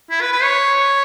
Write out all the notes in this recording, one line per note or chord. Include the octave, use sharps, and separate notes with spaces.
E4
B4
B4
C#5